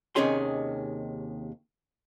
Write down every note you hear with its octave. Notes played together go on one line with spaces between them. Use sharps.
D#2 C3 D#3 C#4 G#4 C6